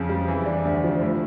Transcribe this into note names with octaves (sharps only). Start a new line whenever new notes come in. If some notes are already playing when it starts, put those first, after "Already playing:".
Already playing: F2 C#3
G3
E3
D4
D2
F3
A2